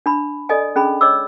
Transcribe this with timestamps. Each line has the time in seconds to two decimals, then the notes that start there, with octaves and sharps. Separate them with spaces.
0.06 D4 B5
0.49 A4 D5 D#5 G#5
0.76 C#4 D4 G#4 B5
1.01 C#5 D#5 D6 E6